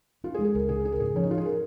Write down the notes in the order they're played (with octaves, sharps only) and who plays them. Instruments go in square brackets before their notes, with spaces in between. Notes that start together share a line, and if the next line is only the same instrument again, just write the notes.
[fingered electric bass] C#4 [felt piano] F4
[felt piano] G#4
[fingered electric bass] G#3
[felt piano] G#4
[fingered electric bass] C#2 [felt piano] A#4
[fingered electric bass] C#3 [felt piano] G#4
[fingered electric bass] C#4 [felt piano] G#4
[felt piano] A#4
[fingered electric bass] G#2 [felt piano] G#4
[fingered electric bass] F3 [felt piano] C#4
[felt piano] D#4
[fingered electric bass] C#4 [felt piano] F4
[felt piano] G#4
A#4